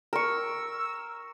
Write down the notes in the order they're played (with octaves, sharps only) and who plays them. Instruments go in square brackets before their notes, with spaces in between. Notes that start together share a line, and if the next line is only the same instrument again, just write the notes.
[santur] A#4 C#6 [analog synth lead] E6